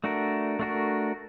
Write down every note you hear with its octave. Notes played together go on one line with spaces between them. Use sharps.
A3 D4 F#4 A#4
A3 D4 F#4 A#4